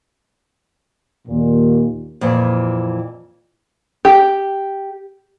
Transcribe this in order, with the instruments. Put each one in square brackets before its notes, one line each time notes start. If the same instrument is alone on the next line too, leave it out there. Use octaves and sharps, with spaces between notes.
[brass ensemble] D#2 A#2
[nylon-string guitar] F2 A#2 E3
[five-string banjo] G4